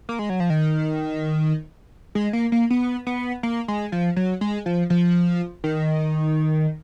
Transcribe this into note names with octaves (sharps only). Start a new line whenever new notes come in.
A#3
G#3
F#3
F3
D#3
G#3
A#3
A#3
B3
B3
A#3
G#3
F3
F#3
G#3
F3
F3
D#3